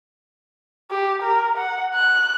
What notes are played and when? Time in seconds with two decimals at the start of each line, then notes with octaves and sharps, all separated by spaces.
0.91 G4
1.22 A#4
1.57 F#5
1.94 F#6